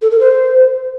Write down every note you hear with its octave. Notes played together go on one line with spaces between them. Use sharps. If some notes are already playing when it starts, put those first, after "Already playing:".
A4
A#4
C5